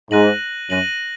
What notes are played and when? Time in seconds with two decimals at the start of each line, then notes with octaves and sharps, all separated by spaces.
0.11 G#2 F#6 A#6 D#7 F#7
0.70 F#2 F#6 A#6 D#7 F#7